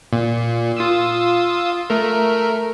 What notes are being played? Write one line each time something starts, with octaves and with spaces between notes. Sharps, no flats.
A#2
F4 D#6 E6
A3 A#4